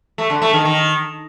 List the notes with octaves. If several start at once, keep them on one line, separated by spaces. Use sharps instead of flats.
A3
D3
A3
D#3
D#3